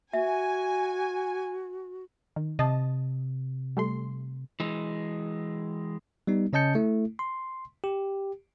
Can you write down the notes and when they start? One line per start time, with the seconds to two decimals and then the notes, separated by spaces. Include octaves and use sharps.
0.13 F#4 E5 G#5
2.36 D#3
2.59 C3 D#5 A5
3.77 G3 A3 C6
4.60 E3 G#3
6.27 G3 B3 D#4
6.53 C#3 C#4 D#5 A5 G6 C#7
6.75 A3 E4
7.19 C6
7.84 G4